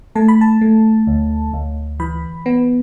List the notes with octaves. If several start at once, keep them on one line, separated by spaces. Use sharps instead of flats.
A3 A5
B5
A5
A3
D2
D2
E3 B5
B3